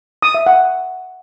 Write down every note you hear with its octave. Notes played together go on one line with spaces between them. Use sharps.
D#6
E5
F#5